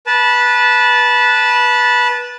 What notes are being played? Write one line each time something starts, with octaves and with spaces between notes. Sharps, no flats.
B4 A5